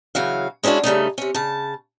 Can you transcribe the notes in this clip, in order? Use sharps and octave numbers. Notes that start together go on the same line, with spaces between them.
C#3 E3 F#3 F5
G#3 C#4 D4 E4 F#4
G2 C#3 A3 D#4
C3 C#4
C#3 A5